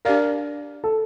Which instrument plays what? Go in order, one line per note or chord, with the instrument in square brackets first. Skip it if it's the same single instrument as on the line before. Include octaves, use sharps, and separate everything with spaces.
[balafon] D4 G4 D5 F5 [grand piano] A#4
[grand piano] A4